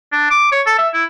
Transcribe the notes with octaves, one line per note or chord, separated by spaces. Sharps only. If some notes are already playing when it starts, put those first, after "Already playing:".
D4
D6
C#5
A4
E5
E4